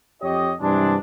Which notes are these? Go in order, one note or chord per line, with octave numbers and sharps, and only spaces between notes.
F2 G4 C#5 D#5
G2 C3 E3 G#3 D4